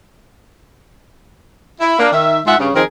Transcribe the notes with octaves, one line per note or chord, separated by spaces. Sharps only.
E4
A#3 D4
D#3 E5
G#2 G#3 F4 E5 F#5
G2 C#3
D#3 F3 C4 D#4 G#4 A#4